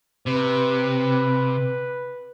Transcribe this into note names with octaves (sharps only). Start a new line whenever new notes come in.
C3 B4